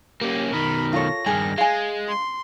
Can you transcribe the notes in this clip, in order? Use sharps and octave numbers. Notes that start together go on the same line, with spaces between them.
A#3 C#4 G4
B2 D#3 A#4 B5
F4 A4 C#5 A#6
G2 D#3 G#4
G#3 F5 G#5
C6